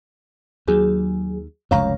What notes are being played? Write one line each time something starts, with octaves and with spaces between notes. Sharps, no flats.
D#2 F#3 G#4
F1 C#2 F#2 C#5 F5 A#5